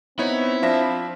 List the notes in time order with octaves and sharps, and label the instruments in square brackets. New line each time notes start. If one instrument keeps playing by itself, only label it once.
[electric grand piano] B3 D#4 C#5 [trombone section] C4 [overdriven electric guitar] E4
[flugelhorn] F3 [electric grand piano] D4 E5 A#6